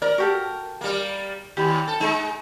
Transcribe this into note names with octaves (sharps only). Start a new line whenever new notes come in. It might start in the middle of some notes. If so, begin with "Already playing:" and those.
A#4 D5
F#4 G4 A4
G3 A#3
D#2 G4 B5
A4
G#3 D#4